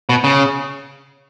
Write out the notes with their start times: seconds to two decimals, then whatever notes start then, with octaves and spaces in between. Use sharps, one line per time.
0.09 B2
0.24 C#3